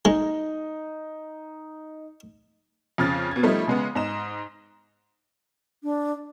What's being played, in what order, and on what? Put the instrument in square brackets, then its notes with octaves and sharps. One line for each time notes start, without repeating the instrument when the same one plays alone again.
[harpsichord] G#3 [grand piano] D#4
[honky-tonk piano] F2 C#3 F6 A6
B2 G#6
F3 G3 A3 D#4
C#3 G#3 B3
G#2 D#5 E7
[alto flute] D4